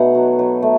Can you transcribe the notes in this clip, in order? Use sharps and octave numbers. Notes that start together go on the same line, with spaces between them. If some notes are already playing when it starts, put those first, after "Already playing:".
Already playing: B2 A3 D#4 F#5
F#3
F#3
A3